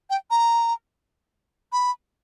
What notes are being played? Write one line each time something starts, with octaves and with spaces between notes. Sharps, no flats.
G5
A#5
B5